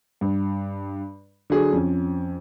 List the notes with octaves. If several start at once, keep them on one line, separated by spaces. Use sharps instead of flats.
G2
D3 F#3 G#4
F2 C#4